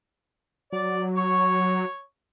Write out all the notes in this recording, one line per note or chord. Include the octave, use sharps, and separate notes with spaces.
F#3 D5
C#5 C#6